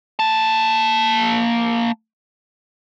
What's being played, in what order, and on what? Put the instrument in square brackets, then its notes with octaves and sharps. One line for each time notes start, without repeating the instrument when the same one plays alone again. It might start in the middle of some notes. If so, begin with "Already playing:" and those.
[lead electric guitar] A#3 A5